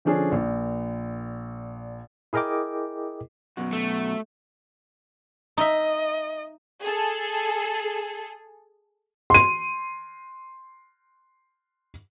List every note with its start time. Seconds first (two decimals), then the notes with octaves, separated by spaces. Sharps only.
0.05 D3 F3 C#4 D4 G#4
0.32 A#1 A#2
2.33 E4 G#4 A#4 D#5 G5 D6
3.57 F#2 B2 F#4
3.73 A3
5.57 D#4 D#5 E5
6.81 G#4 A4
9.30 C6 D#7